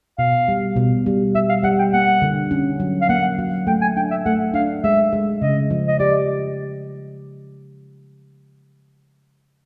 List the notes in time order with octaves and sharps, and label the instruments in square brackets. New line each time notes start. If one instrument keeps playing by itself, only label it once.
[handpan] B2 [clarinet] F5
[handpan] G3
B2
G3
[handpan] G3 [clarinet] E5
[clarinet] F5
[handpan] G3 [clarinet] F#5
[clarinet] G5
[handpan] A#3 [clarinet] F#5
[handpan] D3
C#4
F#3
[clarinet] F5
[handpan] A#3 [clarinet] F#5
[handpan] F#3
[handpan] A3 [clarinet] G5
[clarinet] G#5
[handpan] D4 [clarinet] G5
[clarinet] E5
[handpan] A3 [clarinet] F#5
[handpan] D4 [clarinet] F5
[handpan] G#3 [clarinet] E5
[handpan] G#3
[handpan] C#3 [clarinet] D#5
[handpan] F3
[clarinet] D#5
[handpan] G4 [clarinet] D5